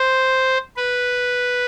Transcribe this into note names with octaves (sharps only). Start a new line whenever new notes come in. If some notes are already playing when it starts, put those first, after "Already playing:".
Already playing: C5
B4